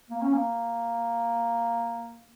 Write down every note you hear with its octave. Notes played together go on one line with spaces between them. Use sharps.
A#3
C#4
A#3